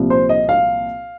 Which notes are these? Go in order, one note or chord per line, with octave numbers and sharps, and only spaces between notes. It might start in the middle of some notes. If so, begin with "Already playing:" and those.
Already playing: C2 A#2 F3
C5
D#5
F5